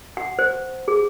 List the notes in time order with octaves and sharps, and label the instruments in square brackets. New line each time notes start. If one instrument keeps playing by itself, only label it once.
[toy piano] F#5
C5
G#4